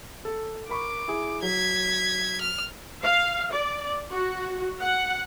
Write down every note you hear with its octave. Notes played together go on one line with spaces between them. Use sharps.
A4
A#4 B5 C#6 D6
E4 G#4
F#3 G#6 B6
F6
F5
D5
F#4
F#5